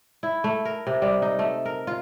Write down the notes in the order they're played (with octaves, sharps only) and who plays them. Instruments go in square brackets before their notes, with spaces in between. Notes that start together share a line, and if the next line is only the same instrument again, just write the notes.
[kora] E4
A3
A#4
C3
G3
D#4
A3
A#4
F4